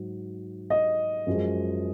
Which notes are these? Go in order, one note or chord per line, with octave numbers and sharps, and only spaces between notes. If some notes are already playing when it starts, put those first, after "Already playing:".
Already playing: G#2 F#3
D#5
F#2 F3 G#3